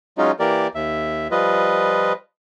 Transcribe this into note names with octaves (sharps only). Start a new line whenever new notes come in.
F#3 G#3 C#4 D#4 F4
E3 A#3 G4 A#4 D5
D#2 E5
F3 G3 F4 B4 D#5